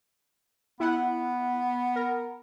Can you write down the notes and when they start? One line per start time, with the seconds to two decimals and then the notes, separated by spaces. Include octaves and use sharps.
0.80 B3 E4 F#5
1.96 A#4